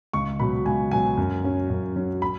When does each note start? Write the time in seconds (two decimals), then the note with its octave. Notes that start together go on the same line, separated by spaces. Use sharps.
0.13 C#2 C#6
0.40 B2 F#3 B5
0.65 C#2 G#5
0.91 B2 F#3 G#5
1.18 F#2
1.44 F#3 C#4
1.70 F#2
1.96 F#3 C#4
2.22 B5